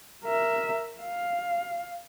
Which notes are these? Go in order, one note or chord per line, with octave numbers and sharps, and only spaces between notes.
A#4 E5
F5